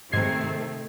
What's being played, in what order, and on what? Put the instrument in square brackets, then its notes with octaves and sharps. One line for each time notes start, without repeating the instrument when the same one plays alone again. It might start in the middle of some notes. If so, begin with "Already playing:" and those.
[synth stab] G#2 G#6 C7 [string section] C3 D#3 A3